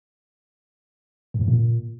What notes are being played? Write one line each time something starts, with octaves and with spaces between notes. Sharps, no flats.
F2
F#2
A#2